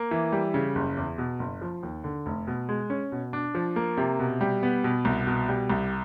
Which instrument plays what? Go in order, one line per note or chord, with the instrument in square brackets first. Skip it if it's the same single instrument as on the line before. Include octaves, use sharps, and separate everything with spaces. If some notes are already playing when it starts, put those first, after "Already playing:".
Already playing: [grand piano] A#3
E3
G3
C#3
F#1
E2
B2
F#1
F3
D#2
D3
F1
B2
G#3
C#4
B2
D4
F3
A#3
C3
B2
G3
B3
B2
C2
B2
G3
C2